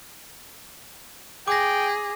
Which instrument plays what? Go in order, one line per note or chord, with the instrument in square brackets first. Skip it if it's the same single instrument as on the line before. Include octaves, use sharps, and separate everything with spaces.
[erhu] G#4 [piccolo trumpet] G5 [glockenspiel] D6 A#6